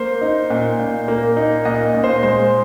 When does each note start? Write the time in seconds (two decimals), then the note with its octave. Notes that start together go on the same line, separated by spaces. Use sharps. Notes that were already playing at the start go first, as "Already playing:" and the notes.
Already playing: A#3 C5
0.21 D#4
0.50 A#2
0.79 A#2
1.08 A#3
1.36 D#4
1.65 A#2 D#5
1.94 A#2
2.04 C5
2.23 G#3 C5